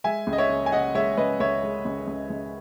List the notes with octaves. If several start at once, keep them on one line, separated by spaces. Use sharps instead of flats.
G#3 E5 G#5
C#2
D#5
C#5 E5
C#3
G#5
C#3 D#5 F#5
G#3 C#5 E5
C#2 B4 D#5
C#2 C#5 E5
G#3
C#2
C#2
C#2